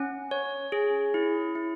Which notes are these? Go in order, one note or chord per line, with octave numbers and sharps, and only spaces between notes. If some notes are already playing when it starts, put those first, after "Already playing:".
Already playing: C#4 F#5
C#5
G#4
E4
E4